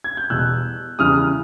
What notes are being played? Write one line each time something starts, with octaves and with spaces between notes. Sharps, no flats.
G#6
G6
E2 B2 G3 E6 F#6
E2 C#3 E3 G3 D#6 F6